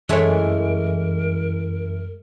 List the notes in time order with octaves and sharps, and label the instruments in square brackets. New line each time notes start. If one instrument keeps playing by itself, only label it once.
[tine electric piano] F#2 [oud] E3 A4 C#5 [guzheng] G#3 A3 [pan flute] A#4